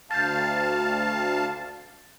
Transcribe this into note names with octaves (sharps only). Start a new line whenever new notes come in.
D2 F5 A5 G6 A6